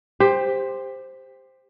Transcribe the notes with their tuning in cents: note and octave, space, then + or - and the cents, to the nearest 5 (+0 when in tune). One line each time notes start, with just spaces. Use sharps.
G4 +20 C5 +0